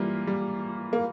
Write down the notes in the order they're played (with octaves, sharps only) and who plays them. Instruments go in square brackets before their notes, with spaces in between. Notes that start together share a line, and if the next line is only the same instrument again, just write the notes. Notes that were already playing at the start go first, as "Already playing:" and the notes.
Already playing: [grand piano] E3 A#3 F4 [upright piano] G3
[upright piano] G3
A#3